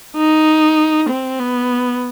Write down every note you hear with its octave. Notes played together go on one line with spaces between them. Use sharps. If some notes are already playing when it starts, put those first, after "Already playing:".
D#4
C4
B3